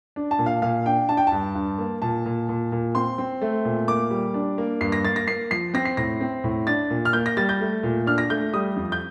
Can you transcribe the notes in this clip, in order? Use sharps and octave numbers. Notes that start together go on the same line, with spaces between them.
D4
A5
A#2
F5
A#2 F5
D4 G5
D4 A5
G5
G2 A5
G2
A#3
A#2 A5
A#2
A#2
A#2
C4 C6
C4
A3
A#2
A#3 D6
G3
D4
A#3
G2 C7
A#6
A#3 A6
A#6
A#3 C7
F3 C7
C4 A#6
C7
A2 A#6
C4
A2
D4 A6
A#2
F6
A#3 G6
A#6
G3 A6
G6
A3
A#2
D4 F6
A#6
A3 G6
G3 D#6
F2
G6